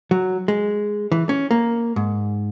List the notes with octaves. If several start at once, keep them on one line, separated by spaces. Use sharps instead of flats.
F#3
G#3
E3
C#4
A#3
G#2